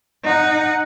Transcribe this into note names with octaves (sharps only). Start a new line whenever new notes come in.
D#4 F#5